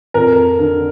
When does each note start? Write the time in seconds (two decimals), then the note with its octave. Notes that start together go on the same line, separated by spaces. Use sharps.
0.14 F2 A#4
0.59 D3